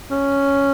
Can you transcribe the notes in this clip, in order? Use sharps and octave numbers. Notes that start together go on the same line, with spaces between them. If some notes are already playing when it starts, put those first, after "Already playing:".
C#4